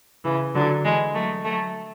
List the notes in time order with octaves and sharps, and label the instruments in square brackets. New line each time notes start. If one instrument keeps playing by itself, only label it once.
[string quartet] C#3 E3
D3 F#3
E3 G#3
F#3 A3
F#3 A3